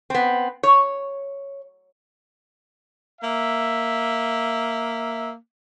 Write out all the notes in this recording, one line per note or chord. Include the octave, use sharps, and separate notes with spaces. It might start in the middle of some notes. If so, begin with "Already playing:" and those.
B3 C4
C#5
A#3 E5